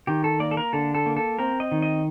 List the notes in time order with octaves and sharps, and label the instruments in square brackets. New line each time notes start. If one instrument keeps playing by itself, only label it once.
[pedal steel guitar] D#3 G4
A4
A#3 D5
A4
A#4
D3 A4
A4
A#3
A4
C4 A#4
D#5
D#3
D#5